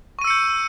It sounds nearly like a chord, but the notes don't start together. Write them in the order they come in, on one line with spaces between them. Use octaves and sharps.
C#6 D#7 E6 C#7 G6